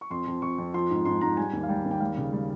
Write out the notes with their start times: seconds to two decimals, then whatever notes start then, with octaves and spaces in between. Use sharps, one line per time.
0.01 C#6
0.10 F2 C6
0.27 F2
0.42 F2 C#6
0.58 F2
0.74 F3 C6
0.91 G#2
1.05 G#2 C6
1.21 G#2 A#5
1.37 G3 G#5
1.53 D#2
1.63 F5
1.69 G3 G5
1.86 D#2
1.91 G5
2.00 G3 F5
2.17 C#3
2.33 G3